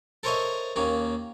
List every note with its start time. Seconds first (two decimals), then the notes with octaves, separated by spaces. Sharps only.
0.23 A4 A#4 C5 C#5 D#5 E5
0.76 D#2 A#3 C#4